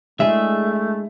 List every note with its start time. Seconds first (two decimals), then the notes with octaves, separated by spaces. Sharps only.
0.20 G#3 A3 D4 E4 G#4 E5